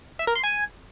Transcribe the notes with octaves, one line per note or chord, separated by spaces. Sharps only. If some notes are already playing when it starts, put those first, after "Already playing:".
E5
A#4
C6
G#5